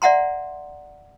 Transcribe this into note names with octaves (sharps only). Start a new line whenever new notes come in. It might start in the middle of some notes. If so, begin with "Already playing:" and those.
D5 E5 F#5 A#5 C6